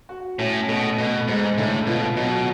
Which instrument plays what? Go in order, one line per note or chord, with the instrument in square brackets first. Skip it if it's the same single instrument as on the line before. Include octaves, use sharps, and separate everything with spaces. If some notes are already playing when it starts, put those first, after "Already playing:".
[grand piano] F#4
[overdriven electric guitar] A2 [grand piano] C#4
[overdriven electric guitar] B2 [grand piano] A3
[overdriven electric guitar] B2 [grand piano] A4
[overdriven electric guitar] G#2 [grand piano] G#3
[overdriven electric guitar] A2 [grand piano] D3
[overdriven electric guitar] B2 [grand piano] F4
[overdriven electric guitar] B2 [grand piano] F#3